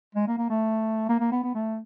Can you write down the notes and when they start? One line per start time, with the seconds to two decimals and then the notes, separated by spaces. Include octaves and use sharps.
0.15 G#3
0.27 A#3
0.38 A#3
0.50 A3
1.09 A#3
1.20 A#3
1.32 B3
1.43 B3
1.55 A3